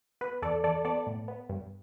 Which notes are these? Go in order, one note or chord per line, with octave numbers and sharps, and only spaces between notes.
B3 B4
E2 A4 D5
E2 A4 D5
B3 A4 D5
A2
B3
G2